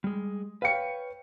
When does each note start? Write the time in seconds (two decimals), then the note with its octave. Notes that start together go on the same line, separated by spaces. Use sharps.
0.04 G3 G#3
0.62 B4 C#5 F5 G5 C#7